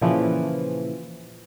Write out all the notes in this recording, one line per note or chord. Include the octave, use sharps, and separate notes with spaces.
A#2 C#3 E3 F3